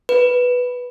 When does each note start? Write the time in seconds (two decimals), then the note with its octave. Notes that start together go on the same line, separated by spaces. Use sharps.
0.09 B4